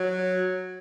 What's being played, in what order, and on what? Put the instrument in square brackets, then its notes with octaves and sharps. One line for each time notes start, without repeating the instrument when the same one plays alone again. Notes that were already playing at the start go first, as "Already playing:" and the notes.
Already playing: [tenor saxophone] F#3